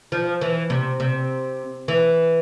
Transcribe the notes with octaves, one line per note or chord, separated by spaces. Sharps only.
F3
E3
C3
C3
E3